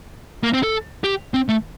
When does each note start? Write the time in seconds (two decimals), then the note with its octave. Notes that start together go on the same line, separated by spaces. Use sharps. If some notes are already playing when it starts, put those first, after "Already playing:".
0.43 A#3
0.54 C4
0.63 A4
1.04 G4
1.34 C4
1.49 A3